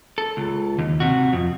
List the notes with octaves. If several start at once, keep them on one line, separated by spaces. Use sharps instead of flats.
A4
C#2
D#2
C3 F#4
F2